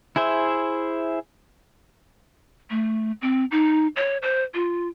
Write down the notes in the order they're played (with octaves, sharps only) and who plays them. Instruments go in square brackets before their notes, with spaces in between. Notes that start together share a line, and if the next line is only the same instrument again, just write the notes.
[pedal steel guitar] E4 G#4 C5 E5
[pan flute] A3
C4
D#4
C#5
C5
F4